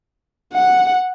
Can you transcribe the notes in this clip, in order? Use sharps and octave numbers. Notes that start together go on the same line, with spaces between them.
F#5